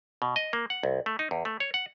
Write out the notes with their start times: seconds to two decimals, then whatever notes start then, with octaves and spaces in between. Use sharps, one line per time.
0.22 B2
0.36 D#5
0.53 A#3
0.70 F#5
0.83 C2
1.06 A3
1.19 D#4
1.31 E2
1.45 A3
1.60 C#5
1.74 F#5